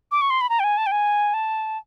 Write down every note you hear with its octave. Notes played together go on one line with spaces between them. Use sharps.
D6
C#6
C6
B5
A#5
G5
G#5
A5
G5
G#5
A5